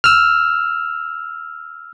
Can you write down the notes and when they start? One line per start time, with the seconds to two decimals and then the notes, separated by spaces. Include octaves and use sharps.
0.04 E6 F6